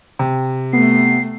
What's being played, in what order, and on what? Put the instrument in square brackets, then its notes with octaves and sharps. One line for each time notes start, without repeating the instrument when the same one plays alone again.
[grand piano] C3
[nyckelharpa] A3 [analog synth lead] B3 [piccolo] C7